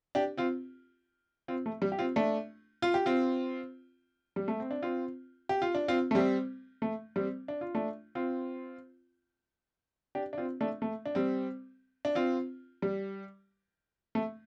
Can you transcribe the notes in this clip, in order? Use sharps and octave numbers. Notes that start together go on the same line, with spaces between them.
D4 G4
C4 F4
C4 F4
A3
G3
G4
C4 F4
A3 D4
F4
G4
C4 F4
G3
A3
C4
D4
C4 F4
G4
F4
D4
C4 F4
A3
G3 C4
A3
G3 C4
D4
F4
A3 D4
C4 F4
D4 G4
D4
C4 F4
A3 D4
A3
D4
G3 C4
D4
C4 F4
G3
A3